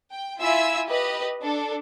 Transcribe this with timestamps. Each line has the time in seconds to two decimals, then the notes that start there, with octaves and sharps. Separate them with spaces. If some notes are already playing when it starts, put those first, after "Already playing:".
0.11 G5
0.40 E4 F4 E5 G#5 E6
0.89 G4 B4 D#5
1.41 D4 A4